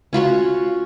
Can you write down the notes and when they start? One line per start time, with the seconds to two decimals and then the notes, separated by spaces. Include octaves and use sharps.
0.13 C#4 F4 F#4 C#5